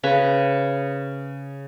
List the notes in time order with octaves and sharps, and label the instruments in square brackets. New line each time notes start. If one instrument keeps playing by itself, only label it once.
[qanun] C#3 B4 C#5